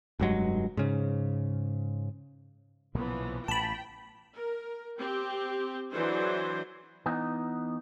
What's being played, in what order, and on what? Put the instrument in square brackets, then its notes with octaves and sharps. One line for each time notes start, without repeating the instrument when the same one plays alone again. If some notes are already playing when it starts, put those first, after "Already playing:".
[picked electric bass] F1 G2 F#3 G#3
G#2 C#3
[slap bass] B1 A#2 C#3 [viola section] E3 F3 B3
[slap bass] A1 A2 [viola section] G5 [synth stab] A5 B5
[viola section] A#4
C4 G4
E3 F#3 D4 G#4 C5
[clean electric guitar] E3 B3 D#4